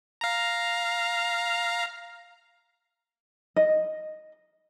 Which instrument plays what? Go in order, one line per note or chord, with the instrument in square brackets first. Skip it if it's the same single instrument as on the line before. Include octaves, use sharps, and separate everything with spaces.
[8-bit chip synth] F5 A#5
[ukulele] D#5